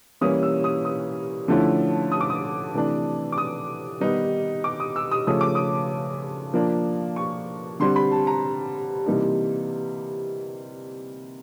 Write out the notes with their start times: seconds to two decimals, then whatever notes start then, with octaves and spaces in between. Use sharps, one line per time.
0.21 E3 G3 A#3 C#4 E4 D#6
0.43 E6
0.64 D#6
0.85 D#6
1.48 D3 F3 A3 C#4 E4
2.12 D#6
2.21 D6
2.30 D#6
2.74 C3 E3 A3 D4
3.32 D6
3.38 D#6
4.01 D#3 G3 B3 D#4
4.64 D6
4.80 D#6
4.96 E6
5.11 D#6
5.27 C#3 F3 A3 C#4 D#6
5.41 D6
5.55 D#6
6.54 F3 A#3 D4
7.16 C#6
7.80 D3 G3 C4 C6
7.96 B5
8.12 A5
8.27 A#5
9.06 C3 E3 G3 A#3 D#4